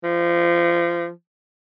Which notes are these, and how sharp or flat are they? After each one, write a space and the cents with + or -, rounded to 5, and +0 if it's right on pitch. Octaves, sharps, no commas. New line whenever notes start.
F3 -25